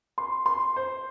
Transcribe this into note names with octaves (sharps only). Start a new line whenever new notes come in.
C6
C6
C5